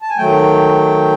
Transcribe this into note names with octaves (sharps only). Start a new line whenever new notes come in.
A5
G#5
D#3 F#3 A3 G5